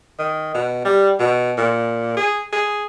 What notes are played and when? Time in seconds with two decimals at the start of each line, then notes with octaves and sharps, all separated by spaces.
0.19 D#3
0.54 B2
0.85 G3
1.20 B2
1.58 A#2
2.17 G#4
2.52 G#4